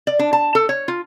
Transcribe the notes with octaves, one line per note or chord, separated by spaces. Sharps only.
D5
D4
A5
A4
C#5
F4